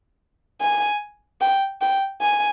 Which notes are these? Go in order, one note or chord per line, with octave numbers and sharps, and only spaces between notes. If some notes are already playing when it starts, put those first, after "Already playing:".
G#5
G5
G5
G#5